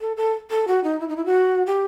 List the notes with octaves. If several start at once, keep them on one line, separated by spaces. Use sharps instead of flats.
A4
A4
A4
F#4
D#4
E4
D#4
E4
F#4
G4